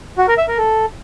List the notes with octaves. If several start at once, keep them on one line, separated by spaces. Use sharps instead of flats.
F#4
A#4
E5
A#4
A4